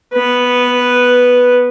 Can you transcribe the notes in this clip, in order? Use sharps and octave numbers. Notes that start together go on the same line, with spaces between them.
B3 B4